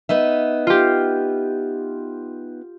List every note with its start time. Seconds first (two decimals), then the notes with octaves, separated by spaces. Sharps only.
0.09 B3 D#4 E5
0.67 F4 G4